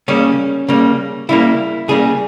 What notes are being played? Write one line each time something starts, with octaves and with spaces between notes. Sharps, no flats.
C#3 G3 A#3 C#4
C#3 G3 A#3
C#3 G3 A#3 E4
C#3 G3 A#3 G#4